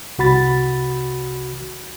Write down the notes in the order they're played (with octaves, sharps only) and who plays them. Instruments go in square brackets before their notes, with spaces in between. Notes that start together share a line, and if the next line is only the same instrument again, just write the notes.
[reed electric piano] C2 F#4 B5 A6